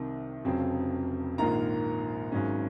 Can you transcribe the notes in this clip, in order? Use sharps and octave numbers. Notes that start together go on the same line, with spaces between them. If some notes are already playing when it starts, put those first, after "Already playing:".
Already playing: C2 C3 D#3
F1 F2 C#3 F#3 C4
A#1 G#2 D#3 A#3 F4 A#5
G#1 G#2 F#3 C#4